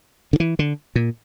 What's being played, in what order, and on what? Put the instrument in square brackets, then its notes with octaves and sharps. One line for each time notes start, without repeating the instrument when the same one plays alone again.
[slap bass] D3
E3
D3
A#2